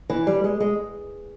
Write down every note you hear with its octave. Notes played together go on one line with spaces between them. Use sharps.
E3
G3
G#3
G#3